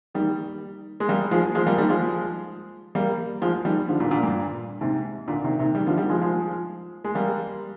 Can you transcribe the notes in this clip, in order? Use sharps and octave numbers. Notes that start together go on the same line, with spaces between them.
D#3 G3
G#3
G3 A#3
F3 G#3
F3 G#3
G3 A#3
D#3 G3
F3 G#3
G3 A#3
F3 G#3
D#3 G3
D3 F3
A#2 D3
A#2 D3
G2 A#2
G#2 C3
A#2 D3
C3 D#3
C3 D#3
D#3 G3
D3 F3
D#3 G3
F3 G#3
F3 G#3
G#3
G3 A#3